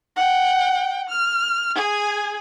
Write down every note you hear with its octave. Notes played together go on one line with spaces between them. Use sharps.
F#5 G5
F6
G#4 G#5